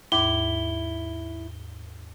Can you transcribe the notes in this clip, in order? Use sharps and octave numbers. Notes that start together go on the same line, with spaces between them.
D#2 G#2 E4 D6 G7